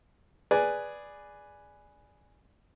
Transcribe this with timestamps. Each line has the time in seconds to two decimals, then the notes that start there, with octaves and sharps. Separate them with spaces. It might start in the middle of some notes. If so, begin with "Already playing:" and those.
0.51 G#4 B4 D5 G#5